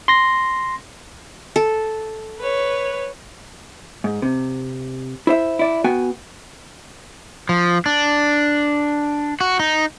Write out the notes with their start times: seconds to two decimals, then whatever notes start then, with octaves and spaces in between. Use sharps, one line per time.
0.08 C6 A#6
1.56 A4
2.39 B4 C#5
4.04 G#2
4.22 C3
5.27 E4 C5 E5
5.59 E4 D5
5.84 B3 F#4 G5 G#5
7.49 F3
7.86 D4
9.41 F#4
9.59 D#4